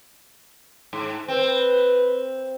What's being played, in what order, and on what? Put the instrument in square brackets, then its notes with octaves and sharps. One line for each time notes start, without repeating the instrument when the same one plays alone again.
[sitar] G#2
[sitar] C4 [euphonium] B4